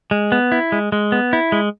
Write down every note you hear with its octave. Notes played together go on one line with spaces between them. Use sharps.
G#3
B3
E4
G#3
G#3
B3
E4
G#3